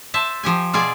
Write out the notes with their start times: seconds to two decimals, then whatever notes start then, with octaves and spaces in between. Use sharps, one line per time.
0.14 C5 E5 A5
0.43 F3 G4 G#5
0.73 B2 F4 G#4 D5 G#5